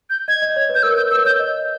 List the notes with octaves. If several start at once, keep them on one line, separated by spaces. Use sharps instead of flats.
G6
D#5 G#6
D#5
C#5
B4
G6
A#4 E6
B4 G6
B4 E6
C#5 G6
D#5